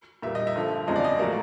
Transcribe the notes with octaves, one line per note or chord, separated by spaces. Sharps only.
A#2 G3 A#3 E5
D#5
E5
G2 D3 F3
E2 C#3 F3 G#3 D#5
D5
D#5
A2 F#3 A#3